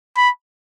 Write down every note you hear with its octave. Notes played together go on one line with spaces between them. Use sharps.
B5